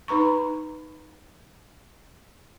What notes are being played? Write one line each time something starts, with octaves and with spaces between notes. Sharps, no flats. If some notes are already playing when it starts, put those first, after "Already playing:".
D#4 B4 A#5 C#6